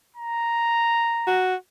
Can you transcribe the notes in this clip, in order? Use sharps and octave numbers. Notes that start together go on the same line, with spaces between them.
A#5
F#4